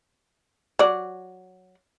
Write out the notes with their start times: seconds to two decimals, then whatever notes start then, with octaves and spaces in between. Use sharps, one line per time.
0.79 F#3 D5